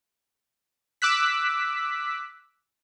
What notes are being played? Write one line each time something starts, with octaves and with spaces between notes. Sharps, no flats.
D6 E6 F#6 B6